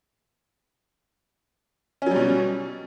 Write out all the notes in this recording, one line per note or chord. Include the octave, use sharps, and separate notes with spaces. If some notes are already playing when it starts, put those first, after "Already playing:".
B2 F#3 G3 C#4